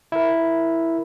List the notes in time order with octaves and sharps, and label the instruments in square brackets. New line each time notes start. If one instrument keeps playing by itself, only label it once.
[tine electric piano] E4 A#4